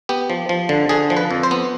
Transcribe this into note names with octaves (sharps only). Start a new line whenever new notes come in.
B3 G4
F3
F3
D3
D3 G#4
F3
B4
F2
C5
B3